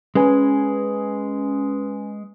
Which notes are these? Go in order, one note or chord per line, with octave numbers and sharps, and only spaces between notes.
G#3 C#4 B4 G#5